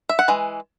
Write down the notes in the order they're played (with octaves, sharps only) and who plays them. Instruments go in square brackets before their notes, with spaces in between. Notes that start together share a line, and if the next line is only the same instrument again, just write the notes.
[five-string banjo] E5
F#5
E3 G#3